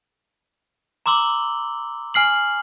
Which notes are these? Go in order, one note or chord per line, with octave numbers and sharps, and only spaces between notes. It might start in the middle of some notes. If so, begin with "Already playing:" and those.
A#5 C6 D6 E6 F#7 G7
G#5 F6 C7 F#7